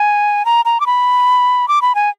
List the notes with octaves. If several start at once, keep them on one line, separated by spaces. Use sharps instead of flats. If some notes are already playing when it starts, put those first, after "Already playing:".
Already playing: G#5
A#5
A#5
D6
B5
D6
B5
G#5